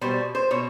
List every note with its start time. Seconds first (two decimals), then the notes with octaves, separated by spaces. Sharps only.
0.01 B2 G3 C5
0.35 C5
0.51 B2 C#5